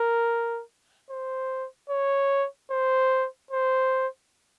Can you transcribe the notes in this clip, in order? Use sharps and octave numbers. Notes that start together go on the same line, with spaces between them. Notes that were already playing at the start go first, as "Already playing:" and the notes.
Already playing: A#4
C5
C#5
C5
C5